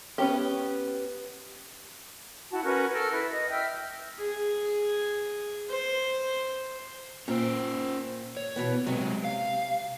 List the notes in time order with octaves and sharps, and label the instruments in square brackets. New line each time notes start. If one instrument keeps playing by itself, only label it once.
[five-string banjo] B3 C#4 G4
[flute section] E4 F#4 F#5 A5
C#4 F#4 A#4 B4
A4 A#4 E6 F6
E4 B4
D#5
E5 G5 E6 F6
[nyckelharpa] G#4
C5
[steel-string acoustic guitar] A#2 [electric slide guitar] C#4 C5
[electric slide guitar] C#5
[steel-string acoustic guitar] B2 E3 B3
[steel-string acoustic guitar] C3 [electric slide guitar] F#3 G#3
[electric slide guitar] F5